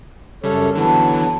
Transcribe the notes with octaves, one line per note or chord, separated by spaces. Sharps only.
F#2 C#3 G3 A4 C#5 E5 C#6 F6
D3 E3 F#3 B3 A4 A5